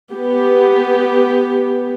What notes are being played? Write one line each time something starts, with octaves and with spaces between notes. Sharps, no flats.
B3 G4